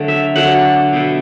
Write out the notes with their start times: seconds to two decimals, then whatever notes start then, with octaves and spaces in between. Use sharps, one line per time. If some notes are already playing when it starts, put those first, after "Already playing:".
Already playing: D3 F#3 A3
0.08 E5
0.35 D3 F#3 A3 F#5
0.93 B2 A3